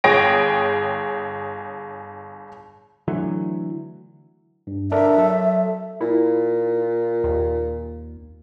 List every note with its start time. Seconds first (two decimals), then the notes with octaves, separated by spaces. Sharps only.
0.04 G1 G#4 C#5 G5 A#6 D7
3.08 D3 E3 F#3 A3
4.67 G2
4.92 D4 A4 A#4 E5
5.18 F#3 A4
6.01 A#2 E4
7.24 D#2